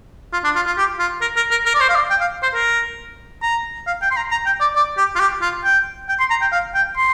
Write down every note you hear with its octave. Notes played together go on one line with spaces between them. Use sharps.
F4
D4
F4
F4
G4
F4
A#4
A#4
A#4
A#4
D5
C5
F5
D5
G5
F5
C5
A#4
A#5
F5
G5
C6
A#5
A#5
G5
D5
D5
G4
F4
G4
F4
G5
G5
C6
A#5
G5
F5
G5
C6